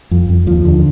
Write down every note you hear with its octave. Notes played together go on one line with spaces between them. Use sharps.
F2
F2
D#2 F3
D3